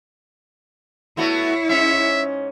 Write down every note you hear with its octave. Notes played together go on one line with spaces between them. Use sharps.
A3 B3 E4 F#4 C#5
G#2 C#4 E5